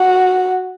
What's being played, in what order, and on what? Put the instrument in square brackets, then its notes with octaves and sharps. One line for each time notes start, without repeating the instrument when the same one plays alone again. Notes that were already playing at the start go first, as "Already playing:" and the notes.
Already playing: [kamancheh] F#4